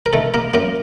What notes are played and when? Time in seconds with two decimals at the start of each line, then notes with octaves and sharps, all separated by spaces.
0.06 A#4
0.13 D#3 A3 A4
0.34 A#3 A#4
0.54 F#2 A#3 A#4